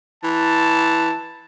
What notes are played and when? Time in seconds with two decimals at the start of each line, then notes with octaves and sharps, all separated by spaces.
0.24 E3 A5